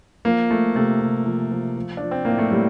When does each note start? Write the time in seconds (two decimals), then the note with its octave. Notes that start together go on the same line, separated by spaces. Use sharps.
0.25 F3 A#3
0.50 F3 A3
0.75 C3 A3
1.01 C3
1.26 F3
1.51 F3
1.77 F3
1.97 F3 D4
2.11 C4
2.25 A2 A#3
2.38 A3
2.51 A2 G3